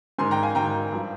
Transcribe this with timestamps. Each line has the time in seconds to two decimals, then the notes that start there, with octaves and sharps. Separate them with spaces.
0.18 G#2 D#3 G#5 C6
0.31 G5 A#5
0.43 F5 G#5
0.55 G#2 D#3 G5 A#5
0.91 G2 F3